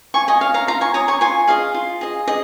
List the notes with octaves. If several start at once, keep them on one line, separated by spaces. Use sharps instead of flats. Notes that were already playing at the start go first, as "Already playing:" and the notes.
F4 G#5 C#6
D#5 G#5
C#5 F5
F5 A#5
F4 F5 A#5
G#5 C#6
C#5 A#5 D#6
G#5 C#6
F4 G#5 C#6
G#4 D#5 F5
F4
G#4 D#5
G#4 D#5